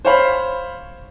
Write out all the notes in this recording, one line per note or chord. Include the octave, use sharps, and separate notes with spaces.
C5 C#5 F5 B5